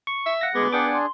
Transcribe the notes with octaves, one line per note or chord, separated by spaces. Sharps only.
C#6
E5
F5 F#5 A#6
D2 G#3 B3 G#4 D6
D4 G#4 B4 F#5 G5 D6
C6